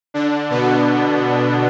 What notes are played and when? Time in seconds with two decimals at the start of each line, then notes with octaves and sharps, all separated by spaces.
0.14 D3 D4
0.50 B2 B3